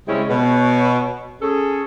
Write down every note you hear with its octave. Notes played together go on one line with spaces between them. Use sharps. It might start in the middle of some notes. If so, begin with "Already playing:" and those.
C#3 G3 G#3 C4 C#4 E4
B2 C#5
C#4 G#4 A4